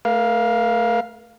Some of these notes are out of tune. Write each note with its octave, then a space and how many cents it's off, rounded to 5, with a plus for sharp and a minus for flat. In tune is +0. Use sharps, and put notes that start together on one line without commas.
A3 +0 A#4 +45 F5 +0